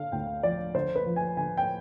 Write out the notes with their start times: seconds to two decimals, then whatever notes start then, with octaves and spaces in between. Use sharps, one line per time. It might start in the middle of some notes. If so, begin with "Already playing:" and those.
Already playing: D3 F5
0.12 D2 G5
0.43 F3 D5
0.75 D3 C5
0.95 B4
1.06 F3
1.16 G#5
1.37 D3 G#5
1.57 G5